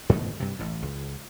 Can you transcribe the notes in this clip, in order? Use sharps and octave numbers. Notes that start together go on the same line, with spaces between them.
G#2 B2 D#3 A3
G2 C3
A1 A2
C#2